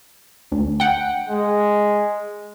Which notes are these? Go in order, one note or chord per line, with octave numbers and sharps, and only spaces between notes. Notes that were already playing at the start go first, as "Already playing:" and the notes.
D2
F#5 G5
G#3